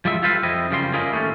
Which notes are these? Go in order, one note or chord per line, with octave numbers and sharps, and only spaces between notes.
F3 G3 G#3 F4 E5
F4 G4 A4 B4 C5 F5
F2 C4 E4 D#5
F#2 C#3 F3 G3 C6
C#4 E4 F4 G#4 A#4 D#5
D#2 A2 A3 C#4